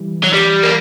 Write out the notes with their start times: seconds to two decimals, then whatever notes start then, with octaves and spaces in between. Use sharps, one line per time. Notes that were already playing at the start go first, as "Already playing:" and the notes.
Already playing: E3 G3
0.24 F#3
0.33 G3
0.63 A#3